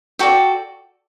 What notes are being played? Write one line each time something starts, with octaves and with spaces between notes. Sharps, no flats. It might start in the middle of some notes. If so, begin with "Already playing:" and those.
F#4 A4 D5 G5